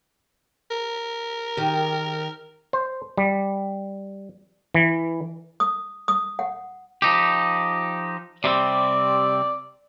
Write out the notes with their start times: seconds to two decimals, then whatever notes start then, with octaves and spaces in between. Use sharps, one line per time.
0.71 A#4
1.57 D#3 G4
2.73 C5
3.18 G3
4.74 E3
5.60 D#6
6.08 D#6
6.39 F#5
7.02 F3 D#4 G4
8.44 C3 G3 C4 D5